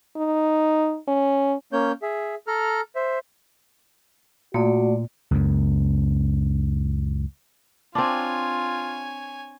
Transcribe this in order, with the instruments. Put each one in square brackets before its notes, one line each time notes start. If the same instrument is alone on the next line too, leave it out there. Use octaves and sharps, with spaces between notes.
[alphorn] D#4
C#4
[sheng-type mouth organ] A#3 C#4 C#5 G6
G#4 E5
A4 A#5 F6
C5 E5
[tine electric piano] A#2 [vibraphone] A3 D5 [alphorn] F#4
[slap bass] C#2 F#2
[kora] C4 D4 [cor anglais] F4 [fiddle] C#5 G#5